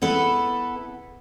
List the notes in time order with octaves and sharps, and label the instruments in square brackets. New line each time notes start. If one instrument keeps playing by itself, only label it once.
[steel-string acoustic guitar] B3 E4 A4 B4